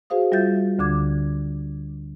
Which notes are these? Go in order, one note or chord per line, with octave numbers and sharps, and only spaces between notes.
F#4 G#4 C5 F5 D#6
G3 F4 E5 G6 A6
D2 D3 D6 G#6